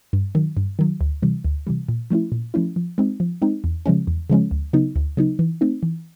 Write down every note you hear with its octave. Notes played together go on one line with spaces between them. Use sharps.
G2
D#3 F#3
G2
D#3 F#3
D2
C3 E3 G3
D2
C3 E3 G3
A#2
F3 A3 C#4 E4
A#2
F3 A3 C#4 E4
F3
G#3 C4 D#4
F3
G#3 C4 D#4
E2
C#3 F3 G#3 C#4
E2
C#3 F3 G#3 C#4
D2
C#3 F#3 B3 D#4
D2
C#3 F#3 B3 D#4
E3
A3 C4 D#4
E3